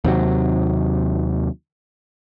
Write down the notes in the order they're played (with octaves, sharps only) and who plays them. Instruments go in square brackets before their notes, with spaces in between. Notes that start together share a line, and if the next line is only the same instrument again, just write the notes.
[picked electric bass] D#2 C3 F#3